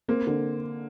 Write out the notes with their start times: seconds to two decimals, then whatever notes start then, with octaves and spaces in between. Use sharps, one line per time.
0.08 A#3 C4
0.27 D3